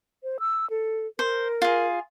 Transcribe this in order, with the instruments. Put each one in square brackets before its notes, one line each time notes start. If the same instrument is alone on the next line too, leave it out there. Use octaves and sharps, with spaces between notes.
[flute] C5
E6
A4
[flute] A#4 [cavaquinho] C5
[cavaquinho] F4 G#4